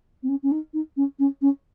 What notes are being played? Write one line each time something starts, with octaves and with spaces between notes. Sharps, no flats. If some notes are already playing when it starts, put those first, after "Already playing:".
C4
C#4
C#4
D#4
D#4
C#4
C#4
C#4